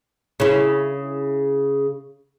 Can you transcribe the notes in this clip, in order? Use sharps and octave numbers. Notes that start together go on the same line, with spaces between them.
C#3 E4